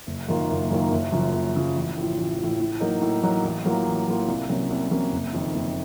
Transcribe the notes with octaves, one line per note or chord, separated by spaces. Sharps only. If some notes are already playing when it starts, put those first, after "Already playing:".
F#1
F#2 D#3 A#3 F4
F#1
F#2 D#3 A#3 F4
F#1
F#2 C#3 F3
F#1
F#2 C#3 F3
A1
A2 F3
A1
A2 F3
A2
F#3 A#3 D#4
A2
F#3 A#3 D#4
A1
A2 F#3 A#3 F4
A1
A2 F#3 A#3 F4
C2
C3 F#3 A#3 C#4
C2
C3 F#3 A#3 C#4
F#1
F2 D#3
F#1